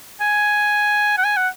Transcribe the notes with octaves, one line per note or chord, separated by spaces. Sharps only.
G#5
F#5
G#5
F#5